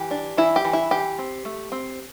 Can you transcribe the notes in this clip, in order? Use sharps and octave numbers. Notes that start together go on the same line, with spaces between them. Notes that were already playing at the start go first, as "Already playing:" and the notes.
Already playing: E3 G4
D4
E3 E4
G4
E3
E4
E3 G4
C4
A3
C4